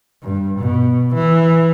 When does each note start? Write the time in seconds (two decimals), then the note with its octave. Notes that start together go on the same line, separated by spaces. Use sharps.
0.23 G2
0.60 B2
1.15 E3